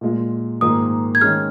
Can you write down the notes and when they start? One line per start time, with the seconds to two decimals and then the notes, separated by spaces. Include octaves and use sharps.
0.01 A#2 G#3 F4
0.61 G#2 D#3 A#3 F4 G#4 D#6
1.15 G#6
1.21 D#3 G#3 C#4 G#4 F6